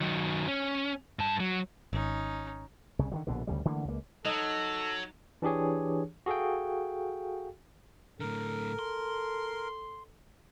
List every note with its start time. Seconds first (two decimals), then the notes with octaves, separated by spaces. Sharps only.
0.01 D#3 F#3
0.48 C#4
1.19 G2 A5
1.40 F#3
1.93 G#1 C#4 D#4
2.99 C2 C#3
3.12 D3 D#3 F#3
3.27 A#1 B2 D3
3.47 D2 C#3 G3
3.65 D3 E3 A3 A#3
3.85 C#2 A#3
4.25 F#3 D#4 A4
5.42 E3 D4 G4 G#4 C#5
6.26 F#4 G#4 A4 F5 G5
8.20 A2 D3 A4 A#4
8.79 C6